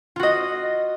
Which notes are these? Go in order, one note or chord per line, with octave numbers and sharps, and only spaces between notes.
F4 F#4 D#5